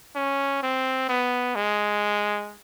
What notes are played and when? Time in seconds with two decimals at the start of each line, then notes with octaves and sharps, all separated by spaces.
0.15 C#4
0.63 C4
1.09 B3
1.56 G#3